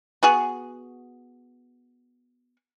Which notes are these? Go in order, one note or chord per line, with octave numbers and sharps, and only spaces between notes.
B3 F#4 G#4